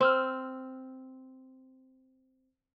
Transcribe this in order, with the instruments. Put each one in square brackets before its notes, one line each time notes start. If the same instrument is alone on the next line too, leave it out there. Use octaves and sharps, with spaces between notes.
[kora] C4 [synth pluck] C5 E6 F6